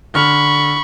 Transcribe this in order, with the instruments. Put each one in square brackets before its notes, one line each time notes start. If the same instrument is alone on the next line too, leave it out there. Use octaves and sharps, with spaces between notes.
[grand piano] D3 F6 [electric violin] B5 C#6